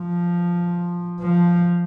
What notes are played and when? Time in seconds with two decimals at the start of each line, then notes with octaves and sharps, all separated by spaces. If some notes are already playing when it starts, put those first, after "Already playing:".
Already playing: F3
1.21 F3